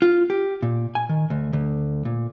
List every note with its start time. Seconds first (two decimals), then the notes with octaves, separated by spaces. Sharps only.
0.02 F4
0.30 G4
0.62 A#2
0.95 G#5
1.09 D#3
1.30 D2
1.53 D2
2.05 A#2